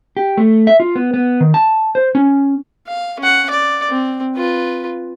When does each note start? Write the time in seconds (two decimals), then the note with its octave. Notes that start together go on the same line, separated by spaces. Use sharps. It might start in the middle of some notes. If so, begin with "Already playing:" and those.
0.17 G4
0.37 A3
0.67 E5
0.80 F4
0.95 B3
1.14 B3
1.41 D#3
1.54 A5
1.95 C5
2.15 C#4
2.87 F5
3.20 C#4 F#5
3.50 D5
3.89 C4
4.36 F4 B4